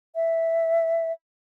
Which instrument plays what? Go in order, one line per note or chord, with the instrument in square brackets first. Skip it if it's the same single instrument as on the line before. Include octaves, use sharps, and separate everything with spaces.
[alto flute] E5